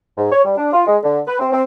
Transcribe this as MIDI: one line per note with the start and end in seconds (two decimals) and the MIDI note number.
0.17 0.30 44
0.32 0.45 73
0.45 0.56 55
0.57 0.69 62
0.73 0.82 65
0.87 0.97 56
1.04 1.20 50
1.27 1.37 71
1.39 1.47 60
1.52 1.63 60